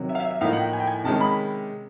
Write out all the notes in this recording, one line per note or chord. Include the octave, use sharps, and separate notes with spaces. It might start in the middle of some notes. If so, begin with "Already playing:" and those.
Already playing: C3 D#3 F#3
E5
F5
E5
E5
A2 F3 A#3 D#4 F5
F#5
G5
G#5
G5
G#5
C3 D#3 G#3 C#4 A5
B5